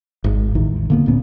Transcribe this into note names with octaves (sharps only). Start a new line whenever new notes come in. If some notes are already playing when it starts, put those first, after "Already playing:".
G#1 G#2
A1 E2 D#3
D3 A#3 B3
D1 A#2 B3 C#4